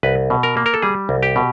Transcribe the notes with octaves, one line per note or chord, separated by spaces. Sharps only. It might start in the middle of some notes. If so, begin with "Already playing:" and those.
C2 B4
B2
A#4
A#3
A#4
A4
G3 G#4
C2
G4
B2